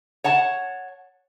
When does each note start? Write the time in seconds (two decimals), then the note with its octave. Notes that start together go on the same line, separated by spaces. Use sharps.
0.24 C#5 F#5 A5